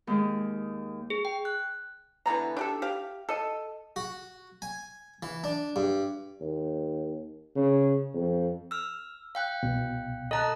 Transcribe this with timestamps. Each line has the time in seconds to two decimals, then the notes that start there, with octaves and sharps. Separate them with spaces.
0.07 D#2 G#3
1.10 G#4
1.25 G5
1.45 F#6
2.26 D3 E3 B3 A#5
2.57 D4 G4 A4
2.82 G4 F5
3.29 A4 D#5
3.96 F#4
4.62 G#5
5.23 E3
5.44 D4
5.76 G2
6.41 D#2
7.55 C#3
8.14 F2
8.71 E6 F6
9.35 F5 G5 F#6
9.63 C2 B2
10.31 A4 D#5 A5 A#5 D#6 F#6